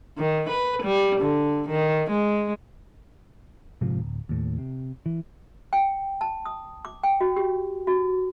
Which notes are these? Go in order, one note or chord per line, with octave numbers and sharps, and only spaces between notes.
D#3
B4
G3
D3
D#3
G#3
A#1 G#2 C3 F3
D1
D#2 A2
C3
E3
G5
A5
D#6
D6
G5
F#4
G4
F#4